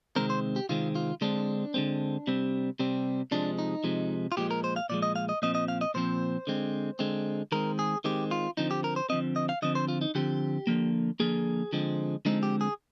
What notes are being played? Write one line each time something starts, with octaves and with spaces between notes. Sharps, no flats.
C3 D#3 G#3 C4 A#4
C5
G4
C3 D#3 G#3 C4 F4
F4
D3 G#3 C4 D4
D3 G#3 C4
C3 G3 C4
C3 G3 C4
C3 F3 G#3 D4
D#4
C3 F3 G#3
F4
A#2 F3 G#3 G4
A#4
C5
F5
A#2 F3 G#3 D5
D#5
F5
D#5
A#2 F3 C4 D#5
D#5
F5
D#5
A#2 F3 C4 C5
D3 G#3 C4
D3 G#3 C4
D#3 G#3 C4 A#4
G#4
D#3 G#3 C4 G4
F4
D3 F3 C4 D#4
G4
A#4
C5
D3 F3 C4 D#5
D#5
F5
D3 F3 C4 D#5
C5
F4
D#4
D3 F3 C4 G4
D3 F3 A#3
D3 F3 A#3 G#4
D3 F3 G#3 C4
D3 F3 G#3 C4 D#4
G4
G#4